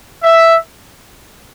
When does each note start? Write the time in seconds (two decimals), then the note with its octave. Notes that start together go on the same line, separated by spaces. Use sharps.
0.23 E5